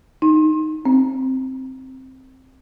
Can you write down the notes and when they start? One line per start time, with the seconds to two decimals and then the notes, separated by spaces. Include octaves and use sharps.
0.22 D#4
0.85 C4